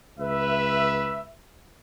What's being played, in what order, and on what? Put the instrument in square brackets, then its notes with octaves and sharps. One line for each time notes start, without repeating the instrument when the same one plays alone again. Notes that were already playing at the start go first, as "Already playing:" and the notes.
[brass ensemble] C#2 B4 E5